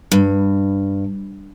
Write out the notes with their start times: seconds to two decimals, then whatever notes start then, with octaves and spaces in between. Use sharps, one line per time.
0.12 G2